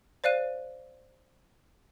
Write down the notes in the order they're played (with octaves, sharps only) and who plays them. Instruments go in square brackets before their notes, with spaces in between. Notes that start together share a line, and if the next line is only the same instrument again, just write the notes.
[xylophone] C5 D5 F5 F#6 D#7